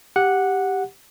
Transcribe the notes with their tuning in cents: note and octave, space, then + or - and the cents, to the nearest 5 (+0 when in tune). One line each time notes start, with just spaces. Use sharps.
G4 +0 F#5 -5